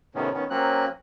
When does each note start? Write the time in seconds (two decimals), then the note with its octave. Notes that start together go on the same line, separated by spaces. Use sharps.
0.15 A2 C3 D#3 B3 C#4
0.34 D#3 B3 C#4
0.50 F#3 A#3 C4 C#4 F#6